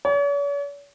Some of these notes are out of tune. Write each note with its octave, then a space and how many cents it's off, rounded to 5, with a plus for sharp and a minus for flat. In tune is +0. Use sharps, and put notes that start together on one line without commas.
C#5 +45